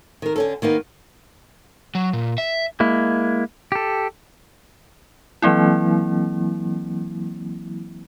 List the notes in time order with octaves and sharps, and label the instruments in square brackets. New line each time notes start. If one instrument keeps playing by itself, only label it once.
[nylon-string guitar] D#3 A#4
D3 C#4 A4
D#3 A#3 B3 D#4
[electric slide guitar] F#3
A#2
E5
[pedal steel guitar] G#3 A#3 E4
G4 A4
[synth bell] E3 F#3 A#3 C4 E4